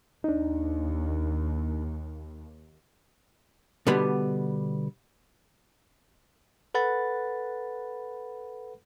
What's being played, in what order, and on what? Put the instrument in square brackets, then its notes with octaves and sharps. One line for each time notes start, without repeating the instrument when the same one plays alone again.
[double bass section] D#2 [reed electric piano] D4 D#4
[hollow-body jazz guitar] B2 D3 G3 B3
[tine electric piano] A4 B4 F#5 B5 A6